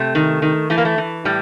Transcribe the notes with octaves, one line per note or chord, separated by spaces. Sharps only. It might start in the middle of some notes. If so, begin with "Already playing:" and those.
Already playing: C3 A3
D#3
D#3
E3 A3
A#3
A3
E3
A2 G3